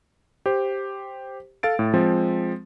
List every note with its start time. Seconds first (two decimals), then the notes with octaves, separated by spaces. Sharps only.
0.46 G4 C5
1.63 A4 F5 A6 D7
1.79 A2
1.94 F3 G#3 C4